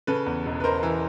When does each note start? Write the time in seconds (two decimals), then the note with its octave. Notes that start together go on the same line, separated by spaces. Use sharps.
0.07 C#3 A4 B4
0.26 E2
0.46 E1
0.60 B4
0.64 E1 A#4 C5
0.83 E3